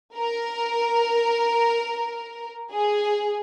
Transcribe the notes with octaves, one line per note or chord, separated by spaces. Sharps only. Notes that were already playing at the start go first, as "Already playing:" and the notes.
A#4
G#4